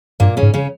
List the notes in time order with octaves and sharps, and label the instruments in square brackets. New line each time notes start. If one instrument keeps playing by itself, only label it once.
[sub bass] G2 [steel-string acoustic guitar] A#2 A#3
[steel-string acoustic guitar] C#3 C#4
[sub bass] G#2
[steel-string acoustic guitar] C#3 C#4